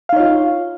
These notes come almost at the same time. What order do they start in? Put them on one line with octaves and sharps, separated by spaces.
F5 D#4 C#5 F4